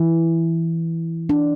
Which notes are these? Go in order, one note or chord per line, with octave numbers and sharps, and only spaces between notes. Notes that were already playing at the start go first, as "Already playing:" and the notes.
Already playing: E3
D4